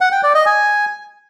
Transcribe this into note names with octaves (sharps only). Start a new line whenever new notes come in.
F#5
G5
D5
D#5
G#5